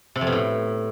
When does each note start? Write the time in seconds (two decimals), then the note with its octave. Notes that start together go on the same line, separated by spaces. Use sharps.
0.16 C3
0.21 F2
0.27 B2
0.32 A2